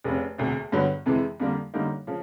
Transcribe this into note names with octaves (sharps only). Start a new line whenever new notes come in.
F1 F2 C#3
E1 D2 C3
G2 D3 F#3 B3
F2 C3 E3 G#3
F2 D3 G3 A#3
F#2 D3 G3 A#3 D#4
C#3 F3